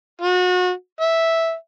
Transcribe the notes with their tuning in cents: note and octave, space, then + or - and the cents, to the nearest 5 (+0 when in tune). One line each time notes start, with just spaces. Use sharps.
F#4 -35
E5 -5